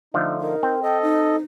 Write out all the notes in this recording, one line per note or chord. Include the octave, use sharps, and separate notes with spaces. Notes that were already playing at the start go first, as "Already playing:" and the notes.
D3 F3 A3 D#4
D#4 A#4
C4
A4 D#5 G5
D#4